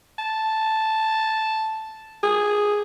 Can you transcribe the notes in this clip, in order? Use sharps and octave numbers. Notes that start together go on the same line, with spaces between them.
A5
G#4